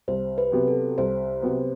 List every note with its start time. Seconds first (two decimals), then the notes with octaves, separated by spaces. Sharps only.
0.08 C2 C5
0.38 B4
0.52 C3 F#3 B3
0.67 A4
0.98 C2 C5
1.42 C3 F#3 B3